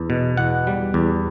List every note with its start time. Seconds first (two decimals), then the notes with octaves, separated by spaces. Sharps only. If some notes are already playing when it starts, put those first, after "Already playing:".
Already playing: E2
0.10 B2
0.37 E2 F#5
0.67 G3
0.94 E2